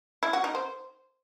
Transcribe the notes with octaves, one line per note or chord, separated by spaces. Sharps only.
E4
F#4
D#4
C5